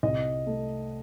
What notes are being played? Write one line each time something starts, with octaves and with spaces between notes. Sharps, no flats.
C2 D#5
A3